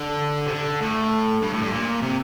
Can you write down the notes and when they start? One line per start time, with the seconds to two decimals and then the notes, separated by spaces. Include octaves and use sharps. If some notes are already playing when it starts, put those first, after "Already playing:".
Already playing: D3
0.47 C3
0.52 D3
0.82 A2
1.42 G2
1.53 A2
1.62 G2
1.72 A#2
2.02 C3